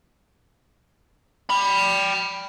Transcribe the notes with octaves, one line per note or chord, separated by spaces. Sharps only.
G5 B5